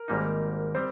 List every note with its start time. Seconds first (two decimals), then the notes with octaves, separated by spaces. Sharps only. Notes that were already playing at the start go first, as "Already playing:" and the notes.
Already playing: A#4
0.08 G#1 G#2 G3 A#3 D#4
0.75 G3 C4 C5